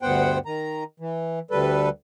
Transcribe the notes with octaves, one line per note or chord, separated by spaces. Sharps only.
D2 G2 B3 C5 F#5 G5
D#3 A#5
E3
D2 G3 A4 B4